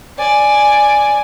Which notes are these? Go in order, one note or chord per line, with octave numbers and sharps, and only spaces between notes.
D5 G#5